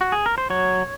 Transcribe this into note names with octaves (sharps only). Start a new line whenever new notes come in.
F#4
G#4
A#4
C5
F#3 C#5